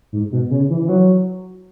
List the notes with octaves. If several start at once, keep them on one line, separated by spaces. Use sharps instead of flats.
G#2
B2
C#3
E3
E3
F#3